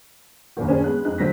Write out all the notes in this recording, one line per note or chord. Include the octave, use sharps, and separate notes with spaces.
F#1 D#2 A#2 D#3
C#4 D4 G#4
G#3 B3 F#6
F2 D#4 F#6
A#2 D3 F#3 C4 A#6 B6